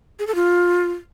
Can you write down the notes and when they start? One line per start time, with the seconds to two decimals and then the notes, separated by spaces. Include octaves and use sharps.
0.19 G#4
0.27 A4
0.35 F4